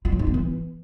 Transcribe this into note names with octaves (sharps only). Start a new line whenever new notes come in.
F4
F#3
D#4
B3
E3